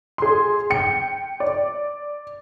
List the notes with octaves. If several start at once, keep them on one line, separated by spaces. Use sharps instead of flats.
G#4 C6
G5 C#7
D5